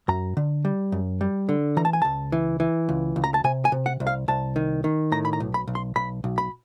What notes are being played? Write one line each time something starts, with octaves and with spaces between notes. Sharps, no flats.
F#2 A#5
D3
G3
F#2
G3
D3
E3 A#5
A5
G#5
C#2 A5
E3
E3
C#2
C#2
A#5
A5
C3 G#5
G#5
C3
F#5
C2
F5
C2 A5
D#3
D#3
A2 A#5
B5
A#5
B1
B5
B1
C6
B1 B5
B1
B5